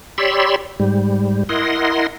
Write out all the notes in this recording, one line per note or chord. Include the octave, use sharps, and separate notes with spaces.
G4 C#5 D5 B5 C6 E6
G#2 G3
E4 A#4 D#5 F#5 C6